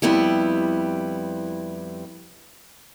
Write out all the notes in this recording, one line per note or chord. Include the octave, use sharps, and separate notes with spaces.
F2 G3 B3 E4 G4